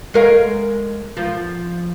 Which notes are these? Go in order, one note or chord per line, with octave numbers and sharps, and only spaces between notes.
G#3 A#4 F5
F3